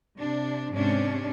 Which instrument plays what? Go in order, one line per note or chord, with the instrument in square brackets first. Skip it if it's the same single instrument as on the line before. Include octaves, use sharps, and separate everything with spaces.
[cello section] C3 D4
G#2 C3 C#4 D4